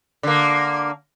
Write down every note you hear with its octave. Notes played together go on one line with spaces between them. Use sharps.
D3 A#3